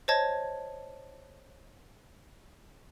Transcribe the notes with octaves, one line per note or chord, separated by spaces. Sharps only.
C5 C#5 D#5 A5 G#6